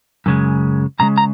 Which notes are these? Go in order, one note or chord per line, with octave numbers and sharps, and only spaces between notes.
F#2 C#3 G#3
F#2 C#3 G#3 A#5
A#5